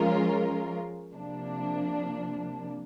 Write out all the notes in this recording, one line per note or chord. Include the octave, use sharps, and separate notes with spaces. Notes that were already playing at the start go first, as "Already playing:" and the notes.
Already playing: F3 G#3 C#4 F4 A#4
C3 F3 A#3 D4